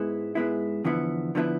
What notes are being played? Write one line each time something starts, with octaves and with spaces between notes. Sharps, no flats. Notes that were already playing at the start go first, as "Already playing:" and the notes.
Already playing: G#2 G#3 B3 E4
G#2 G#3 B3 E4
E2 D3 F3 B3 E4
D3 F3 B3 E4